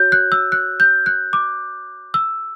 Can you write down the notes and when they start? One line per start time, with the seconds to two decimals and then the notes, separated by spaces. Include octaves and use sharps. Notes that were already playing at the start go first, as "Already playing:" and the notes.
Already playing: F#4 C#5 G6
0.12 F#6
0.32 E6
0.52 F#6
0.80 G6
1.06 F#6
1.33 D6
2.14 E6